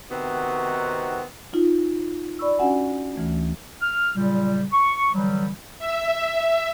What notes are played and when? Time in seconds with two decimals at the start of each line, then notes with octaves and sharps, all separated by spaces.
0.11 C3 D#3 B3 C4 D#4 F#4
1.53 D#4 F4
2.39 D5 B5 C#6 E6
2.59 C#4 D4 F#4 F#5 G#5
3.15 D2 E3 A3
3.82 F6
4.16 A#2 C#3 F#3 G3
4.72 C#6
5.14 D3 E3 F#3 G3
5.79 E5